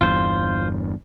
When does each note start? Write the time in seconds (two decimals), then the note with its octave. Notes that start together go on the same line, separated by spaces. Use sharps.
0.01 G1 E2 G2 F4 C5